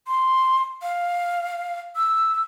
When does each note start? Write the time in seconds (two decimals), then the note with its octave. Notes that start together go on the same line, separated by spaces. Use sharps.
0.07 C6
0.82 F5
1.96 E6